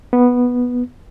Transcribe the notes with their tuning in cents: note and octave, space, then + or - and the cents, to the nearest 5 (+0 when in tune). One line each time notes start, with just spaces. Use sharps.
B3 -5